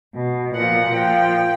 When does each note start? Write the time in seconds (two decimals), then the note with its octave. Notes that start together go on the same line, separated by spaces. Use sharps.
0.15 B2
0.55 A#2 F3 F#5
0.94 A#2 F3 G5